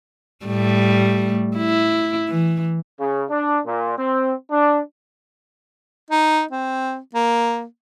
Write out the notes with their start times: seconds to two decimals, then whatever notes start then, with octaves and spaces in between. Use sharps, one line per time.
0.45 A2 G3 A3
1.57 E4
2.28 E3
3.00 C#3
3.30 D4
3.65 A#2
3.98 C4
4.51 D4
6.11 D#4
6.51 C4
7.14 A#3